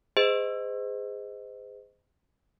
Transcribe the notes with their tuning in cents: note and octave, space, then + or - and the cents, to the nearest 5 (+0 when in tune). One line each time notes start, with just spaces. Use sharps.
G#4 -15 C5 -40 D#5 +0